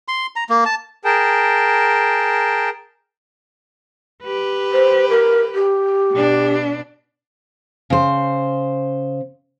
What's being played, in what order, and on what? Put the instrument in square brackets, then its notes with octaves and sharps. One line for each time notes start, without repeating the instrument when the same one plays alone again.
[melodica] C6
A#5
A#3
A5
[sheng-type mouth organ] G#4 A#4 G5 A5
[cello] G4 B4
[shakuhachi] C5
A#4
G4
[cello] B2 D4
[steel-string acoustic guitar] C#3 C5